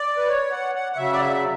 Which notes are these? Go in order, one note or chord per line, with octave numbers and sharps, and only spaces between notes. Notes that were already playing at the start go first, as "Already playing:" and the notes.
Already playing: D5
B4
C#5
F#5
F#5
F#5
C#3 F#3 E5
D5
E5